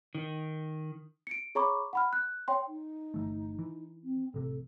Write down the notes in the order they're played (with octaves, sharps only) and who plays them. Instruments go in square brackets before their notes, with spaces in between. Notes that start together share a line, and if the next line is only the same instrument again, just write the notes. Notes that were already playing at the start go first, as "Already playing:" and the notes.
[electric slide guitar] D#3
[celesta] C#7 D7
G#4 C#5 A#5 B5 C#6 D6
F#5 B5 F6
F#6
C#5 G5 C6
[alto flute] D#4
[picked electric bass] G1 E3 A3
E3
[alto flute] C4
[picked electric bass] A1 C3 [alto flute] A4